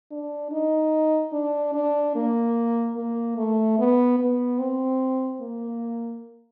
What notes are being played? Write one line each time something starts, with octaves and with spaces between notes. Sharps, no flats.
D4
D#4
D4
D4
A#3
A#3
A3
B3
B3
C4
A#3